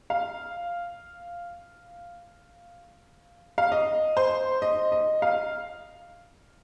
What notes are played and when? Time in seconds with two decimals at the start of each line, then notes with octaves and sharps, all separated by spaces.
0.10 F5
3.58 F5
3.72 D#5
4.17 C5
4.62 D#5
4.92 D#5
5.22 F5